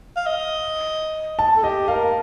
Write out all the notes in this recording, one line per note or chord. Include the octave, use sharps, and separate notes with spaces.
F5
D#5
A5
A4
G4 D#5
A#4 F5